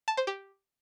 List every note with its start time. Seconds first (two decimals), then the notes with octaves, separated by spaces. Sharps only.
0.08 A5
0.17 C5
0.27 G4